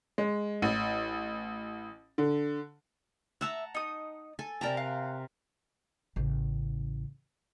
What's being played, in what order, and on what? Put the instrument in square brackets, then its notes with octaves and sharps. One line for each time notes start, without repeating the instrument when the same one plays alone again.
[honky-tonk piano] G#3
A1
D3
[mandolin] E5 E6 [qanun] F#5 A5 A#5
[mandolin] D#4 D#6
[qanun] A4 G#5
[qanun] C3 A#4 A#5 [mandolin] D5 G5 A5
[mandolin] F5 F#6
[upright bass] A1 C#3